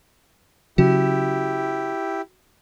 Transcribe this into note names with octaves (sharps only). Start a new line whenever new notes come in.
C#3 F#3 E4 F#4 G4